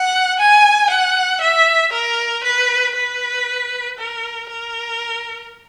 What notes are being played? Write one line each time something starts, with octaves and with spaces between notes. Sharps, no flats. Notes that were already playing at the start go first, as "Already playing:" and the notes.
Already playing: F#5
G#5
F#5
E5
A#4
B4
B4
A#4
A#4